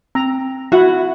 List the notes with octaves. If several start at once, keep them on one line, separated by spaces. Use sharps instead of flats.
C4 A#5
E4 F#4 F#5